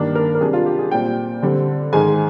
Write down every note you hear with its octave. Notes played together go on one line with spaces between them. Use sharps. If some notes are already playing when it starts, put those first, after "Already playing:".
Already playing: G2 D#3 A#3 D4
A#4
A#4
C3 G3 D4 G#4
F4
G4
G#4
A#2 G3 C4 G5
D3 G3 C4
G#2 D#3 G#3 G#5